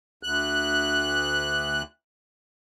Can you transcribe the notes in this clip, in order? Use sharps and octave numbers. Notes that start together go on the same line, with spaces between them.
D2 F#6